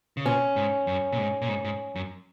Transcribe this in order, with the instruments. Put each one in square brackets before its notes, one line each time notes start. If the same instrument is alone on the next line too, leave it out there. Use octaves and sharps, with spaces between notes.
[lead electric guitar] C#3
[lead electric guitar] A#2 [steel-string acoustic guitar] C#4
[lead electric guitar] G#2
F#2
A#2
G#2
A#2
G#2
G#2
F#2